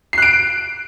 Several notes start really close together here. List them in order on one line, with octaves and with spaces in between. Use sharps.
C7 F#6 D7